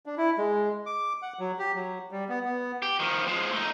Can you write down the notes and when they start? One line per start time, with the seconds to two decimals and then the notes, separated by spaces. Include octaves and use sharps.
0.06 D4
0.18 E4
0.38 G#3
0.86 D6
1.22 F#5
1.39 F#3
1.59 G4
1.75 F#3
2.11 G3
2.29 B3
2.45 B3
2.82 G4
3.00 D#3 F3
3.27 F3 G#3
3.52 A3 D#4